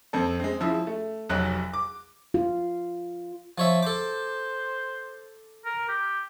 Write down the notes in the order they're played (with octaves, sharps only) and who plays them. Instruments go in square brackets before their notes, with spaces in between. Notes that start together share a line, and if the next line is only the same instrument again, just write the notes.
[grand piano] F2 C4 A4
G#3 C4
C#3 F3 E4 E6
A3
F1 B1 F#3 F#6
D6
[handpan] F4
[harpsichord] F3 C#5 E5
[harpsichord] A4 D6 [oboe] C5
[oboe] A#4
G4